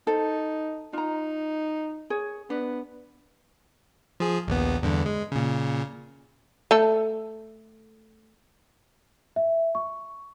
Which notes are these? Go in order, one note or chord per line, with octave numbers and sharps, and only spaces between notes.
D#4 A4 C5
D#4 F4 A#5
G#4 C#5
B3 D4
F3 G#4
A#1 D#2 B3
E2 G2 D3
G#3
A#2 C#3
A3 A4
E5
C#6